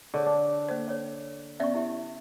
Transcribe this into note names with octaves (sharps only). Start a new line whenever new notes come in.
D3 G#4 C#5 C#6
D4
A#3 C5
C#5 D5
B3 C#4 D5 E5 C#6
E4 G4 E5